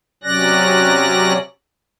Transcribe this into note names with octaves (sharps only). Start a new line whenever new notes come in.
C3 F#3 C#4 D5 F#6 A#6